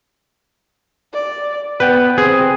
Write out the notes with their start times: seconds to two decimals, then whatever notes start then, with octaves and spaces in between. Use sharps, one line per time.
1.13 D5
1.80 B3 B4 G5
2.18 C4 G#4